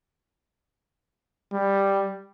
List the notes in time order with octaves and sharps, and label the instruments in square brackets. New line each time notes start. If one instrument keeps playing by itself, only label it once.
[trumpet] G3